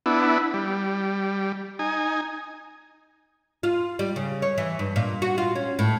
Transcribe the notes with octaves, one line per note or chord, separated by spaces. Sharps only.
B3 D4 E4
G3
D#4 G#5
F4
G3
C#3
C#5
E3
G2
A#2
F#4
F4
C#4
A2